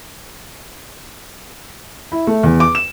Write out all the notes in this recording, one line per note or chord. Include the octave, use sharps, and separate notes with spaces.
E4
A3
E2
D6
E7